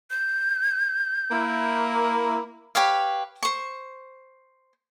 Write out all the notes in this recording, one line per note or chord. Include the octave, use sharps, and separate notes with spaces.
G6
A#3 E4
G4 B4 C#5 F5
C5 C#6